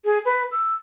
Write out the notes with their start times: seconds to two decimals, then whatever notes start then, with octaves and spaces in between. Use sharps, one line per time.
0.05 G#4
0.25 B4
0.52 E6